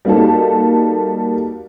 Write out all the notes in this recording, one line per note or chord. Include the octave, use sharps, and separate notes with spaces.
G3 A#3 D#4 F#4 A4